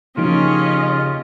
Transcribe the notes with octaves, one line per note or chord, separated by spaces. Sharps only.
C#3 F3 A#3 C#4 D#4 F4 G4 D#5